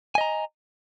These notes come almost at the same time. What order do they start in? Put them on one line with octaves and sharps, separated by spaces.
G#5 D#5 A#5